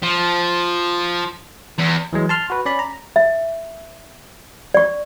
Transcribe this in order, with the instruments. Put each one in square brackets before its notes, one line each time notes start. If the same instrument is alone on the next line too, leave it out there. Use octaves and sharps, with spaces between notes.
[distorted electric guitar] F3
E2
[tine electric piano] E3 F#3 G#3
A5 C6 F6
F#4 B4
C#4 D5 B5
A#5
[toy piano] E5
D5 C#6